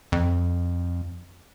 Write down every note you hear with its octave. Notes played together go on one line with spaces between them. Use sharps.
F2